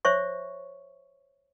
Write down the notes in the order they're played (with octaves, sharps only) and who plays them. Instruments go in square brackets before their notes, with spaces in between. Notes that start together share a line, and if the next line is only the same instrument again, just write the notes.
[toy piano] C5 C#5 E5 C#6